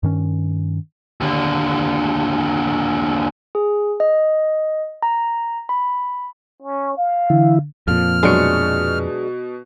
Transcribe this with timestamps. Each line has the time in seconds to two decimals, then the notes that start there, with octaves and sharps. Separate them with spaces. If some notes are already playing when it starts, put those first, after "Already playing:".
0.03 G2 D#3 C#4
1.21 D#2 D3
3.55 G#4
4.00 D#5
5.03 A#5
5.69 B5
6.62 C#4
6.97 F5
7.30 D3 E3 E4
7.88 F2 A#2 F3 F6
8.23 B2 F#3 G#3 D4 C#7